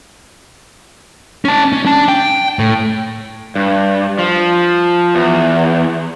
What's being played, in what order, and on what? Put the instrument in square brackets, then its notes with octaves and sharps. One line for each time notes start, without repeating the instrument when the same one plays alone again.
[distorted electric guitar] C#4 A5
C#4
D4 A5
G5
A2
[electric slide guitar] G2
F3
E2